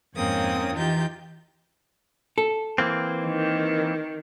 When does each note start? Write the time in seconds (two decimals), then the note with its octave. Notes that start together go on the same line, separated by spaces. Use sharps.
0.16 F2 G#2 A#3 C4 C#4 D#6
0.75 E3 D#4 F4 G4 G6
2.38 A4
2.78 E3 A#3 C4
3.26 D#3